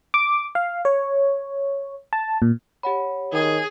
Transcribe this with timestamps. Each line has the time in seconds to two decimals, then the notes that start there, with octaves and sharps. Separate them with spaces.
0.14 D6
0.55 F5
0.85 C#5
2.13 A5
2.42 A#2
2.83 G4 C#5 F#5 B5
3.33 D#3 G#4